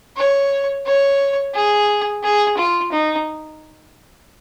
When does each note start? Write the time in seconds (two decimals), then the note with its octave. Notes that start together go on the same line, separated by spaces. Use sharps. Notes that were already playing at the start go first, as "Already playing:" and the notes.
0.17 C#5
0.86 C#5
1.54 G#4
2.23 G#4
2.57 F4
2.92 D#4